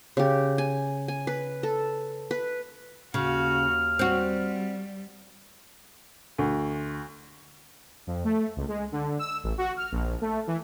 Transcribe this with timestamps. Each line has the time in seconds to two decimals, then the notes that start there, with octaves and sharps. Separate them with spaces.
0.17 C#3 G4
0.58 G#5
1.08 G#5
1.27 B4
1.63 A4
2.31 B4
3.14 D#2 C#3 A#3 F#4 F6
3.99 G3 C4 F#4
6.38 D2
8.07 F2
8.24 A3
8.57 C#2
8.68 G#3
8.92 D3
9.19 E6
9.43 A1
9.58 F#4
9.77 F6
9.92 A#1
10.21 A3
10.47 E3